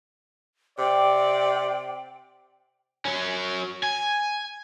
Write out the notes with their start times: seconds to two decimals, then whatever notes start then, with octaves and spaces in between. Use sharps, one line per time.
0.79 C3 D5 G5
3.05 F#3 C#4
3.84 G#5